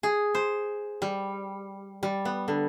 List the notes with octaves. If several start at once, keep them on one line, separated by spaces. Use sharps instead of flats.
G#4
C5
G3
G3
B3
D3